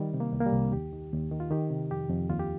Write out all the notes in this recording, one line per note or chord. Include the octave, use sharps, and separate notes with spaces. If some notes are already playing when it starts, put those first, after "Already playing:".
Already playing: D#3 G3
C3
A#3
C2
A#3
G3
C2
D#2 G4
D#3
D#2
D#3
F4
D#3 G4
C3
F2 G4
F2
D#2 F4
G4